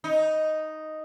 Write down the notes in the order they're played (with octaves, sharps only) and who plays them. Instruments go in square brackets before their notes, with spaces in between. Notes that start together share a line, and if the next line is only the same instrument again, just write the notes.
[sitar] D#4